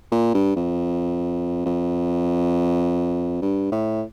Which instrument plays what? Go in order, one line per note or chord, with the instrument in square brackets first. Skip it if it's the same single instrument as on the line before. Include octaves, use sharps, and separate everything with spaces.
[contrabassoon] A#2
G2
F2
F2
G2
A2